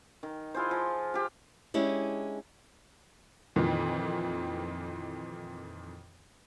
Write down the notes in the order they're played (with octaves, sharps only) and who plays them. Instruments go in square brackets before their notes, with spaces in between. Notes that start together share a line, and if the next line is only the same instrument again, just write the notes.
[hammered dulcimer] D#3
E4 F4 G#4 C5
F3
F4 G4
[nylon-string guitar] G#3 C#4 D4 E4 G4
[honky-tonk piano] F2 A#2 D#3 E3